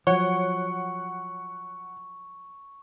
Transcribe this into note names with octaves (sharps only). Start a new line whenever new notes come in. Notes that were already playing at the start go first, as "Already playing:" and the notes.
F3 F#3 C#5 F#5 C#6